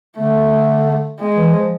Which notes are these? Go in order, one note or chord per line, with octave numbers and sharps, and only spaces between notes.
D3 A3
G#3
E3
F3